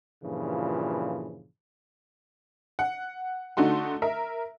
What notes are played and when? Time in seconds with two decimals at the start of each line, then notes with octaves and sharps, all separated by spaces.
0.23 G2 A#2 C#3 E3 F3
2.79 F#5
3.57 D3 A3 D#4 F#4 C6
4.02 A#4 E5